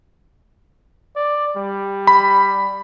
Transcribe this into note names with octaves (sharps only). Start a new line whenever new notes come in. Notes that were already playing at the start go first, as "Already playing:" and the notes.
D5
G3
B5